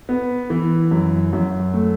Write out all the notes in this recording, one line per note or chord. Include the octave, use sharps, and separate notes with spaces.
B3
E3
F#2
F#2
A3